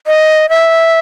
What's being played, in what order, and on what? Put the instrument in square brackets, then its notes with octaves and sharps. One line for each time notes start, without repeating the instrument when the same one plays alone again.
[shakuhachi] D#5
E5